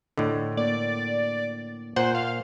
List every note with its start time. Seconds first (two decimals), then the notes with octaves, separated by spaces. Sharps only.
0.18 A2 D3 A4 D#5
0.57 A#3 D5
1.96 A#2 C5 F#5
2.15 F5